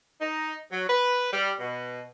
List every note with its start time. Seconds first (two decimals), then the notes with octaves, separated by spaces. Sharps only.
0.21 D#4
0.71 F#3
0.88 B4
1.32 G3
1.59 B2